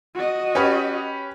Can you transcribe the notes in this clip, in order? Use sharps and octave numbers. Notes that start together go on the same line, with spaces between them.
F#4 D#5
C#4 G4 B4